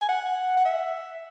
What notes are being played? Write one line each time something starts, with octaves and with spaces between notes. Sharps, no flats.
G#5
F#5
F#5
E5